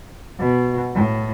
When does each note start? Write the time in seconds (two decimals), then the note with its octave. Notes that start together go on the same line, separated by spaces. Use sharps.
0.38 B2
0.94 A2